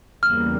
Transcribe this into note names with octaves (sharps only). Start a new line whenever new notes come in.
E2 C#3 G3 A#3 F6